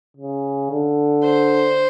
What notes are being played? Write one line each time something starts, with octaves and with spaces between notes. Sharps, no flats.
C#3
D3
C5